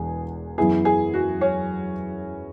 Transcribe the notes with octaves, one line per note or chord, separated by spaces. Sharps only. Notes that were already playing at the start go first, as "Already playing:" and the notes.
Already playing: E1 E2 G#4
F#2 E3 B3 E4 G#4
G#4
F#4
C#4